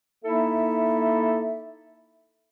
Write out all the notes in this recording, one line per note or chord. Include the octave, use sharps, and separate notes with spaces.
A#3 D#4 E4 A4 E5